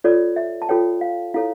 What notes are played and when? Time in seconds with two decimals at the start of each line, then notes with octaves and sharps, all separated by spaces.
0.04 F4 A4 C#5 D5
0.36 E5
0.62 A5
0.69 F4 A4 C#5 G5
1.01 F5
1.34 E4 A4 C#5 F5